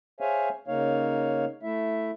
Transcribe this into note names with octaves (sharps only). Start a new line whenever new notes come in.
G#4 C5 C#5 E5 F5 G#5
C#3 A#3 D#4 C#5 F5
A3 E4 E5